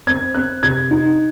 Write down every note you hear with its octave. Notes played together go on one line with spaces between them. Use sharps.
C4 G#6
C4 F#6
C3 G#6
D#4